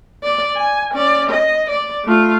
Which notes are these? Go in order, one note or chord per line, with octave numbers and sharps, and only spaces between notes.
D5
G#5
C#4 D5
D#5
D5
A3 F4